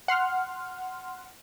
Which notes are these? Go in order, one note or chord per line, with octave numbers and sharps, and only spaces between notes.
F#5 C6 F6